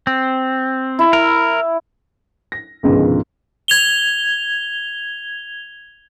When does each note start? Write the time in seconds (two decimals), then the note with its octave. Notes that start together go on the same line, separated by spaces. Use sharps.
0.07 C4
0.99 E4
1.13 A#4
2.52 A#6
2.83 C#2 G#2 B2 D3 D#3 F3
3.68 G#6 F7 G7